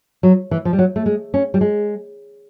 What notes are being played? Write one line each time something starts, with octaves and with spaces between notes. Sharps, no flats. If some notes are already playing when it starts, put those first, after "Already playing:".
F#3
E3
F3
G3
F#3
A3
G#3
C#4
G3
G#3